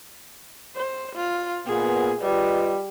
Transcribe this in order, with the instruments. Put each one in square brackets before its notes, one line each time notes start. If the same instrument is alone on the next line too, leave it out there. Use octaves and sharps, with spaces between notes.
[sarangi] C5
F4
[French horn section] A#2 B3 [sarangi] G#4
[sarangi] G3 [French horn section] F4 B4 D#5